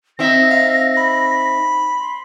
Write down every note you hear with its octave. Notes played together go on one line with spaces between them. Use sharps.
C4 D#4 E5 A#6
F5
B5
C6